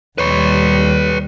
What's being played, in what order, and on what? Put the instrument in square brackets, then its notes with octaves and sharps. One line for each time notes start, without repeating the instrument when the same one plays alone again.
[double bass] D#2 G3 [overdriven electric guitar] B4 C#5